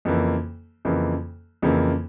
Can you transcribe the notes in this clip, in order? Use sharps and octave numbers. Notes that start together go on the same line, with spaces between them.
F2 C#3 E3 A#3
F2 C#3 E3 A#3
F2 C#3 E3 A#3